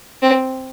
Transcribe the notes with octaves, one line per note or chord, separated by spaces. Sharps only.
C4